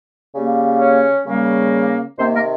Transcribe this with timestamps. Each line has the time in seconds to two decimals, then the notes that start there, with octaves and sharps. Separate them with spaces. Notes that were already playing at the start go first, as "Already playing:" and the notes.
0.33 C#3 G3 A#3
0.79 C#4 C#5
1.25 C#3 G3 A#3
2.18 C3 D#3 A#3 C4 C5
2.34 A#3 A#4